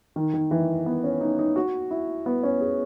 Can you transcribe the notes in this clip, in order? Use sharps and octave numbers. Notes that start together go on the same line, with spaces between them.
D#3
D#3
E3
B3
C#4
D#4
D#4
F#4
E4
B3
C#4
G#4